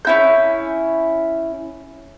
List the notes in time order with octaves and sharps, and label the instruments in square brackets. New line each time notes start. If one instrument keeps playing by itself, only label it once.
[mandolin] C#4 E4 G6